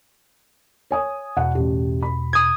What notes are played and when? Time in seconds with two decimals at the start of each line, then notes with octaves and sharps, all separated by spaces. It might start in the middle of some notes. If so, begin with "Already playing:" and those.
0.91 C#5 G#5 D#6
1.37 E2 B2 F#5
1.55 A1 G4
2.02 B5
2.33 D#6 G#6